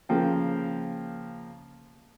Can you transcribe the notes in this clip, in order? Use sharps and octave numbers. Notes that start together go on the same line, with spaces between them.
C#3 F3 A#3 G5